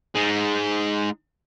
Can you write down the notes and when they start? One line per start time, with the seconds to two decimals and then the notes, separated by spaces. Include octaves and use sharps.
0.15 G#3 D#4